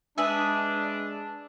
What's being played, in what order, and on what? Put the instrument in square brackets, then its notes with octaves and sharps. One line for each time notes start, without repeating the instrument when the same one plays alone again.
[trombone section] G#3 D4 [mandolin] G#4 B4 E5